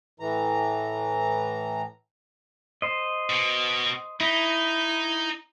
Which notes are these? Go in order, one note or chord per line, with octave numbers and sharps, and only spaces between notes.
A2 E3 A#5
C5 D#5
B2
D#4 E4